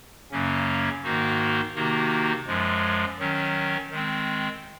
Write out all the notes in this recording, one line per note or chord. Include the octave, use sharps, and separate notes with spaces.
F#2 C#3 F#3 A#3 C#4
G#2 D#3 A#3 D#4 F#4
C3 D#3 A#3 D#4 F#4
F#2 F3 G#3
D#3 F#3 C#4
D#3 G#3 C4